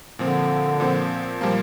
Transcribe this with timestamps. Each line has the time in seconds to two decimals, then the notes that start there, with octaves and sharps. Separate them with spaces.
0.19 A#2 D3 F3 C4
0.80 A#2 F3 C4
1.41 A#2 F3 G3 A#3